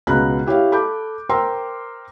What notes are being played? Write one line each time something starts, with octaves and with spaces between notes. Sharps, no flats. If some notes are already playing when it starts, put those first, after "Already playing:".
C#2 B2 A#5 B5 F#6
E4 G4 C#5 F5
A4 B5 D6 G6
A#4 C5 G5 A#5 C6 E6